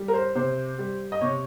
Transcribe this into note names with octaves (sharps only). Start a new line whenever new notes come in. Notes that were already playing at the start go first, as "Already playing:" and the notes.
Already playing: G3
A#4
C5
C3 C5
G3
D#5
C3 C#5